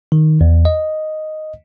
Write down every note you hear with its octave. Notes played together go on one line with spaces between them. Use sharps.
D#3
E2
D#5